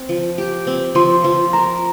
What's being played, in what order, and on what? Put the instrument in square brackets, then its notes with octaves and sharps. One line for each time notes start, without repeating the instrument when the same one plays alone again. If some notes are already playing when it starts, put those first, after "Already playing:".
Already playing: [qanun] C4
F3
G4
C4
[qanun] F3 [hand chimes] C6
[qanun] F3
[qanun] A#4 [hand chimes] A#5